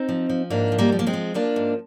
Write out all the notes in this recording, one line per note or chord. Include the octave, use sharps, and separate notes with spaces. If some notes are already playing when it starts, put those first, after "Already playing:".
Already playing: C4 D#4
F3
F3
G#2 A#3 D4
F3
G3 A#3
F3
A#3
G#3 C4
F3
F3 A#3 D4
G#2